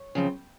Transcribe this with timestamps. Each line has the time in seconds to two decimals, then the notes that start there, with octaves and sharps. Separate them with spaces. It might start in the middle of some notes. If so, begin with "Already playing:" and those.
Already playing: C#5
0.15 C#3 F3 C4